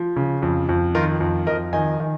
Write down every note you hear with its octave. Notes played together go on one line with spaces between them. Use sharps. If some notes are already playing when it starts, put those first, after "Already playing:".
Already playing: F3
C#3
F2
F2
D#3 F4 A#4
F2
F2 A#4 D#5
D#3 D#5 G#5
D#3